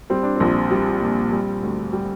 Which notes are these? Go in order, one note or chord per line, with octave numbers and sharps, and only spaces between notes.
G3 C4
D4
A#1 C4
G3
A#2
G3
D2
G3